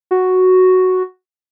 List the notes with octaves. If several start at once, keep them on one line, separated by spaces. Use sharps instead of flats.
F#4